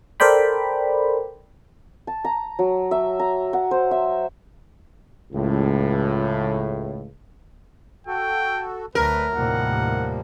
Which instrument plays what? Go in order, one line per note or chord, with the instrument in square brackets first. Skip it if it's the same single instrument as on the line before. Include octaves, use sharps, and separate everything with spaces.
[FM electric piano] A4 A#4 C5 D5 G5 B5
[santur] A5
A#5
F#3
E5
A#5
F#5
C5
E5
[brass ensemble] C#2 A2
[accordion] F#4 A4 [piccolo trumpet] G5
[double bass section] D2 [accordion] F#3 A3 [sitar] A#4 [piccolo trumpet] B4
[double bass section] D#2 A2 C3 [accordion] F3 G3 A#3 [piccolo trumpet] F#5